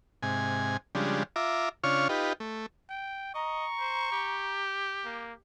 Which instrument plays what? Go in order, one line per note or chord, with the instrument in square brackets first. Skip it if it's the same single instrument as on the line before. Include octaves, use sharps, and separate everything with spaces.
[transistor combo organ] G#2 C3 G#5
C#3 F3 G3 G#3 D4
F4 E5 A#5 D6
C#3 D4 F4 C#5 C#6 F6
D#4 F4 G4 B4
A3
[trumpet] G5
[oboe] D#5 [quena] A#5 [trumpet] C#6
[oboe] C5
G4
[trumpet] A#3